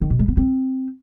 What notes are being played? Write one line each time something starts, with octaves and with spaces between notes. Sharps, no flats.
D#3
B2
G#3
B3
C4